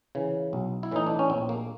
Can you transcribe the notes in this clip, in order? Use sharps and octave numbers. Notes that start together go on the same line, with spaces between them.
C#3 E3
B1
E4
A2 E3 D#4
D4
C#4
A#1 C4
A#3